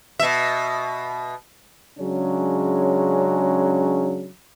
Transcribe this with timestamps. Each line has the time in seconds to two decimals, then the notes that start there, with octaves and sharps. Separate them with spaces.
0.19 B2 E5
1.98 C#3 F#3 G#3 C#4 D4